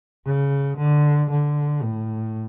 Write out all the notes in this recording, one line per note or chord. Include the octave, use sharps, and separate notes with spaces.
C#3
D3
D3
A2